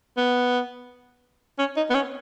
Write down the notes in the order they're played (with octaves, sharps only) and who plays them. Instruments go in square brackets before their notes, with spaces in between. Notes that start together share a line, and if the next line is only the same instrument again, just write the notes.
[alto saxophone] B3
C#4
D#4
B3
C#4